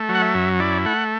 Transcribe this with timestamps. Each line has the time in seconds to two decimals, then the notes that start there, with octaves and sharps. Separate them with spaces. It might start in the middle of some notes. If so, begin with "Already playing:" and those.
Already playing: A3
0.09 F#3
0.15 F#5
0.22 E5
0.34 F#2
0.60 E4 D5
0.86 A3 F#5